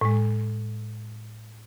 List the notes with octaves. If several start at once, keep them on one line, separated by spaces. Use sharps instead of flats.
A2 G#3